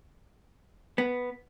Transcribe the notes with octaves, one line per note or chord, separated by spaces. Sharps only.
B3